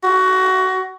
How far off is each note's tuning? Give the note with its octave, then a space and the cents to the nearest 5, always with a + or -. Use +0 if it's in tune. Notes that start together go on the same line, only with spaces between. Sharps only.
F#4 +20